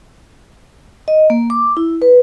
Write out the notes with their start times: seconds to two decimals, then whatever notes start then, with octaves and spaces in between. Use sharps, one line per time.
1.08 D#5
1.30 A#3
1.50 D6
1.77 E4
2.02 B4